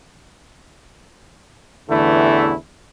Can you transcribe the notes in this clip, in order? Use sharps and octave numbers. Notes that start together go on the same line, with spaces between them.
A1 E2 D3 E3 A3 E4